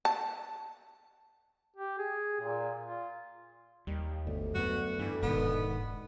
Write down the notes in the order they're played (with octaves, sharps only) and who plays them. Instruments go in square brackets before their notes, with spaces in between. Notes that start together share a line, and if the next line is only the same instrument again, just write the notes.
[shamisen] A5
[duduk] G4
G#4
A#2
F4
[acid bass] D#2 [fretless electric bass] G3
[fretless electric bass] G1 [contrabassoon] D2
[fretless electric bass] F#2 B3 [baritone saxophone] F#4
[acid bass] G2 [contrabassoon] D3 [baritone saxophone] E3
[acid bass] E1 [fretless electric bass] G#2 B2 D#3 [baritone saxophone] B3